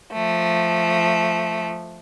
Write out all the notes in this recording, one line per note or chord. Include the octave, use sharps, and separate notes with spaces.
F3 A3